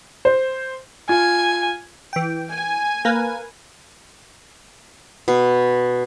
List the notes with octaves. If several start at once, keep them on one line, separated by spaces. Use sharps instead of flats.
C5
F4 G#5 G#6
E3 G5
G#5
A#3 A#4 B4
B2